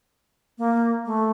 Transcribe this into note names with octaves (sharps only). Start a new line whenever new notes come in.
A#3
A3